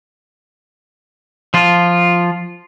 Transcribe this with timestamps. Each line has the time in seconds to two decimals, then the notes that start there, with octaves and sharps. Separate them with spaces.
1.54 F3 F4